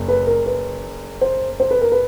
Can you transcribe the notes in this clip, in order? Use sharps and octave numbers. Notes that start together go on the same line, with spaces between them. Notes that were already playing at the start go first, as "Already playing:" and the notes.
Already playing: F#1
B4
A#4
B4
C5
C5
B4
A#4
B4